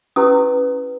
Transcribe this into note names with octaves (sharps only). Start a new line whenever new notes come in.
C#4 E4 G4 B4 D#6